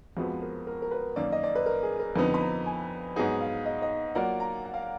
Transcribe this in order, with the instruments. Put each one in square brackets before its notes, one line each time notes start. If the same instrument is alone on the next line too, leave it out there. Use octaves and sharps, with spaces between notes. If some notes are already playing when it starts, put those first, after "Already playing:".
[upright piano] F2 F3 G#3 B3 [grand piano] F#4
[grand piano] A#4
A#4
A#4
B4
[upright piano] F#2 D#3 A#3 [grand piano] D5
[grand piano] D#5
D5
B4
A#4
G#4
A#4
[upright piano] F2 D3 F3 B3 D#4 [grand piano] B4
[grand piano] B5
A#5
G#5
[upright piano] G#2 F#3 B3 D#4 G#4 [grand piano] F#5
[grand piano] F5
D#5
D#5
[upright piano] F#3 A#3 F4 A#4 D5 [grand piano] F#5
[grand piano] A#5
F#5
F5
F#5